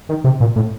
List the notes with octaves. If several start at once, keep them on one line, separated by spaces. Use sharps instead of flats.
D#3
C3
A#2
A2